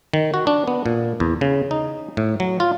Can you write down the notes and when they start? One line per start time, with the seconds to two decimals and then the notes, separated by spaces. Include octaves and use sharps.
0.14 D#3
0.34 F#4
0.47 D4
0.67 B3
0.86 A#2
1.20 E2
1.41 C#3
1.71 D#4
2.17 A2
2.40 F#3
2.60 F4